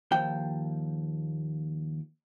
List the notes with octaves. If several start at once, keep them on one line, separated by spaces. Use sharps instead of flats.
D#2 F3 G5